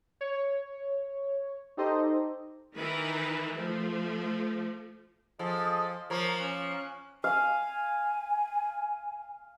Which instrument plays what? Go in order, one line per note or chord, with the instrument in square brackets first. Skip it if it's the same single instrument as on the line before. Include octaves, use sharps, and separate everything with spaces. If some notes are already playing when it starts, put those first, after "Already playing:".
[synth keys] C#5
D#4 G4 A4 C5 D#5
[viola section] D#3 E3 A#4 B4
F3 A3
[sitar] F3 [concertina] G#4 A4 D#5
[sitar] F3 A#3 [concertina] A#4 C#5
[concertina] C#4 F#6
[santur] F5 [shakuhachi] G#5